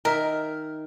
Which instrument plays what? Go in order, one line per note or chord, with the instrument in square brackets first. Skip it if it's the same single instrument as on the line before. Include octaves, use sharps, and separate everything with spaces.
[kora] D#3 E5 [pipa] A#4